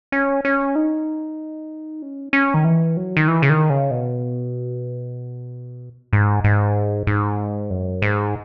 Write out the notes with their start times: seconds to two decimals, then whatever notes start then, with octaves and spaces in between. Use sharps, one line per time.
0.12 C#4
0.45 C#4
0.75 D#4
2.02 C#4
2.33 C#4
2.54 D#3
2.64 E3
2.97 F#3
3.17 D#3
3.28 E3
3.42 C#3
3.50 D#3
3.70 C#3
3.91 B2
6.13 G#2
6.44 G#2
7.07 G#2
7.70 F#2
8.02 G#2